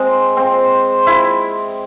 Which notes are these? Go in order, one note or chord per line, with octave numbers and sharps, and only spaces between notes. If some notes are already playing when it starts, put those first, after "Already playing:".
Already playing: G#3 C4
C4
E4